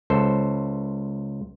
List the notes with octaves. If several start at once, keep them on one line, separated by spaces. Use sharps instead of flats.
C#2 A4 C5